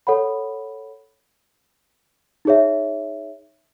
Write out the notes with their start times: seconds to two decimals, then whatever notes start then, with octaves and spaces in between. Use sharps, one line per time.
0.07 A4 C#5 F#5 B5
2.45 D#4 G#4 C#5 E5